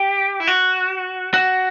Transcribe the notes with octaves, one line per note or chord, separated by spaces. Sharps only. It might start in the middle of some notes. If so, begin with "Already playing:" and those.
Already playing: G4
E4
F#4
F#4